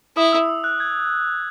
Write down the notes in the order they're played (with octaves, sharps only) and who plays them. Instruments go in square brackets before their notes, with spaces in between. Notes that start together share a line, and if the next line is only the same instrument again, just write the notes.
[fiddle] E4 [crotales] D#6
[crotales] E6
E6
F#6
G#6